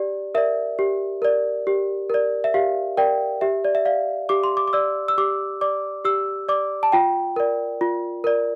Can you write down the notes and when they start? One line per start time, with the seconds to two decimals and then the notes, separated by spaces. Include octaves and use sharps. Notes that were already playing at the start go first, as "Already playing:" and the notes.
Already playing: G4 D5
0.35 A#4 D5 E5
0.79 G4
1.22 A#4 D5
1.67 G4
2.10 A#4 D5
2.44 E5
2.54 G4 F5
2.97 A#4 D5 G5
3.41 G4 E5
3.65 D5
3.75 E5
3.85 D5 F5
4.29 G4 D6
4.44 C6
4.57 D6
4.68 D6
4.73 D5 E6
5.08 E6
5.18 G4 D6
5.61 D5 D6
6.05 G4 E6
6.49 D5 D6
6.83 A5
6.92 F4 G5
7.36 A#4 D5
7.81 F4
8.24 A#4 D5